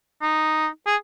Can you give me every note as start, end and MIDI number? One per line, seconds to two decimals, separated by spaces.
0.22 0.67 63
0.87 0.96 68